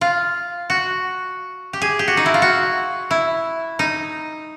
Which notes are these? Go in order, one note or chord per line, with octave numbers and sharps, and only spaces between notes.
F4
F#4
G4
G#4
G4
F#4
D#4
E4
F4
F#4
E4
D#4